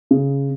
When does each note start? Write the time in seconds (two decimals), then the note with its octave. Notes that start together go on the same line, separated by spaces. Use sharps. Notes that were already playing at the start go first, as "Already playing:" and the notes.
0.11 C#3